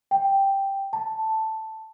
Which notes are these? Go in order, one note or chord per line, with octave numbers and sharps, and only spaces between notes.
G5
A5